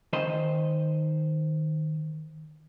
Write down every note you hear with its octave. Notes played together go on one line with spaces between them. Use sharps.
D#3 C5 D#5